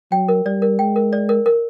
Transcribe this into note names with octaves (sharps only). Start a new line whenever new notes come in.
F#3 G5
A#4
G3 D5
A#4
G#3 G5
A#4
D5
A#4
A#4